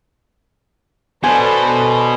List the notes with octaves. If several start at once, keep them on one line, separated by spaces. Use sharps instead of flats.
B2 D4 A4 B4 C5 G#5